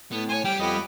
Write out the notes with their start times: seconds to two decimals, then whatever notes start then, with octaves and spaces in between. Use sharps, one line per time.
0.12 A2 B3
0.29 C5 C#5 G#5
0.44 G3 G5
0.59 F2 B3 G4 D#5